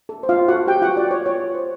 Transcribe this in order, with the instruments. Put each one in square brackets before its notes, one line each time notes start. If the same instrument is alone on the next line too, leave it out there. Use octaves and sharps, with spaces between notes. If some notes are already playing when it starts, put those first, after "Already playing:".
[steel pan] A4
C5
F4 F5
C5
F#4 A4 F#5
G4 C5 G5
F4 F#4 F#5
F4 D5
F4 C#5
F4 C#5
F4
C5